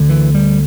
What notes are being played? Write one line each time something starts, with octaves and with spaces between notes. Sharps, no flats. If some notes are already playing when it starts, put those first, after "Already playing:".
Already playing: D2 D3
E3
G3